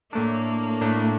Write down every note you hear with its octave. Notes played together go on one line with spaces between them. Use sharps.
A2 A3 A#3 D4
A2 A3 D4